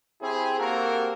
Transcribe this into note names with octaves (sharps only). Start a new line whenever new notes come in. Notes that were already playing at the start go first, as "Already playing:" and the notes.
C4 E4 G4 G#4
A#3 C4 F#4 G4 A4 A#4